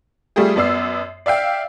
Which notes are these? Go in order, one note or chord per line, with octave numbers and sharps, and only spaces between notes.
G3 A3 F4 G4 G#4
F#2 B3 D5 E6 C7
D5 E5 F5 G5